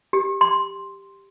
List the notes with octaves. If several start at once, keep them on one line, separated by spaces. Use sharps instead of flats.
G4
C6